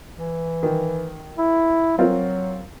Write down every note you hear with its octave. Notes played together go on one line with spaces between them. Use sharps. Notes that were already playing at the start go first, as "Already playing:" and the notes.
E3
D#3
E4
F#3 C4 F4 A#4